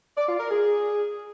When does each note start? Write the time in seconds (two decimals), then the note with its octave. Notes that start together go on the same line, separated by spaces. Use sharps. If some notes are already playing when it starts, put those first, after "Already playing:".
0.17 D5
0.28 F4
0.40 A#4
0.51 G#4